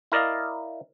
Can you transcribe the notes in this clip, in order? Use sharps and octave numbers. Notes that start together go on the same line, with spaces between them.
E4 A#4 D5 D#5 F5